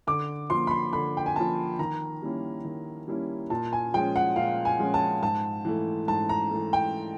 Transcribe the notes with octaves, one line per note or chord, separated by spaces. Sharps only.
D3 D6
F3 A#3 C6
B5
C6
D3 B5
G5
G#5
F3 A#3 A5
D#3 A#5
G3 A#3 C#4 E4
D#3
G3 A#3 C#4 E4
A#2 A5
G#5
F3 G#3 C#4 G5
F#5
A#2 F5
G#5
F3 G#3 C#4
A5
G#2 A5
E3 A3
G#2 A5
A#5
E3 A3
G5